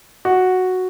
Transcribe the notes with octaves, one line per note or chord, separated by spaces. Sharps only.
F#4